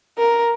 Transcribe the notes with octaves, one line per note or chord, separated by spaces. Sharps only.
A#4